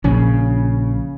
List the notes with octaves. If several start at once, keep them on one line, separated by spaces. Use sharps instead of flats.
A#1 C#3 C#4